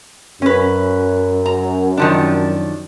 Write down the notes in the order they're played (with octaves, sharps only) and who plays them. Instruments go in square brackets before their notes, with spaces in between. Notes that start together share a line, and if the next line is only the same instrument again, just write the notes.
[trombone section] F#2 [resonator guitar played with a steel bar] C#4 B4
[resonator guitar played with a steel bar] A#5
D#3 F3 D4